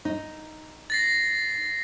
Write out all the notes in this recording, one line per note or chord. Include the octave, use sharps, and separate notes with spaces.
D#4
A6 A#6 C7